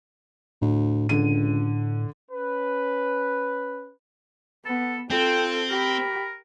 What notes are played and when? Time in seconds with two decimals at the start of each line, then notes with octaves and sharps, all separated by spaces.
0.62 D2 A2
1.09 C#2 D3 D#7
2.30 C#4 B4
4.65 B3 A4
5.10 C4 F4 A4 G5
5.69 G4 A#4 B5